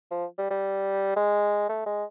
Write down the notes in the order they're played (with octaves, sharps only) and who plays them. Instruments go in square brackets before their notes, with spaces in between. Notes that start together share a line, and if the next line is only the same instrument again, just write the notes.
[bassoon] F3
G3
G3
G#3
A3
G#3